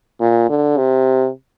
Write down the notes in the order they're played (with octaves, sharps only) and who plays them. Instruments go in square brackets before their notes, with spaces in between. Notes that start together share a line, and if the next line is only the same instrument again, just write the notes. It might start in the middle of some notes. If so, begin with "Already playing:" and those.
[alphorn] A#2
D3
C3